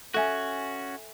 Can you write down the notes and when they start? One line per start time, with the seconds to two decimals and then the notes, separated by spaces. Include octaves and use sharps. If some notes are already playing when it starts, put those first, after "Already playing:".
0.14 C#4 F#4 A4 E5 G#5